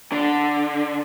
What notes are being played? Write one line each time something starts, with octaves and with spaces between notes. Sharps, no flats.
D3